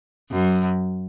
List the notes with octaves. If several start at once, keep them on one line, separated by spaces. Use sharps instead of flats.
F#2